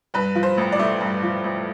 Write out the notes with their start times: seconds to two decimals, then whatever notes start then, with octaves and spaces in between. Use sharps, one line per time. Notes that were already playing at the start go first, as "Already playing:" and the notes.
0.14 G2 B4
0.35 F3
0.43 C5
0.58 A1
0.72 D5
0.79 A3
1.00 G2
1.23 F3
1.44 A1